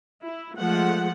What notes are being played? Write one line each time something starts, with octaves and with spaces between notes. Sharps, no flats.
E4
F3 G#3 A3 F#5